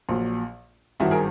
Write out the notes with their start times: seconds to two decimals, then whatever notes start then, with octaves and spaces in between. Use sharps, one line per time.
0.09 A#1 A#2 F#3
1.00 G#1 G2 D#3 F#3 E4 F#4
1.11 G#4 A#4